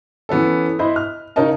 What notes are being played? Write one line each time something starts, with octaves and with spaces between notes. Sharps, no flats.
E3 B3 C#4 A4
E4 C5 D#5 B5
F6
C#3 D#4 A#4 C#5 D#5 A5